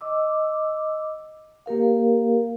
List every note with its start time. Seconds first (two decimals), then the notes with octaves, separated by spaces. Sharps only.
0.01 D#5 D6 E6
1.66 A#3 G4 A#4 F5